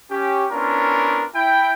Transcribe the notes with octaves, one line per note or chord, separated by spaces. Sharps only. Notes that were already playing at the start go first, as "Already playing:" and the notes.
C#4 G4
B3 C#4 D4 E4 F4 A#4
E4 G5